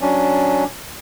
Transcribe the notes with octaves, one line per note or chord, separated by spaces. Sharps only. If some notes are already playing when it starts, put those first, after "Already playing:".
F#3 C#4 D4